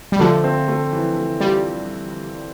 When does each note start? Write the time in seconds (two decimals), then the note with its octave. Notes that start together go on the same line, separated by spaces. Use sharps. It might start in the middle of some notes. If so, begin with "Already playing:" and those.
0.12 G3
0.19 D3 F3 A3
0.44 C4
0.68 A3
0.93 E3
1.17 A3
1.40 G3 F4